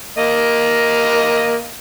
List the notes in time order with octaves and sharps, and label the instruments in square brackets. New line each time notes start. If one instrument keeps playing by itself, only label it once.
[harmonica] A#3 D#5